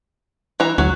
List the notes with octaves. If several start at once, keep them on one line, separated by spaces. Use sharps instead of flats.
E3 A#5
D2 F#3